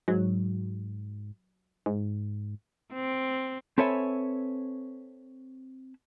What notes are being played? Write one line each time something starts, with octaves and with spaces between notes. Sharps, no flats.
G#2 F#3
G#2
C4
C4 A4 B4 C#5 E5 G#5